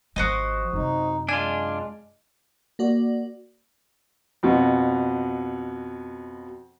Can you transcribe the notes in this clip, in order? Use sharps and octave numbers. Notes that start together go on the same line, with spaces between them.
G#1 F3 F#4 C5 D#5
F#2 C3 D#4
G#3 D4 F4 G#5
A#3 F#4 D5
F2 B2